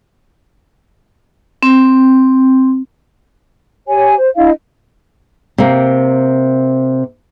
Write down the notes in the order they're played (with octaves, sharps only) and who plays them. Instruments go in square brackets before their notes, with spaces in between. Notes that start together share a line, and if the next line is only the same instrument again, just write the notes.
[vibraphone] C4
[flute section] G4 C#5 G#5
C5
D4 E4 D#5 F5
[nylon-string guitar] C3 A#3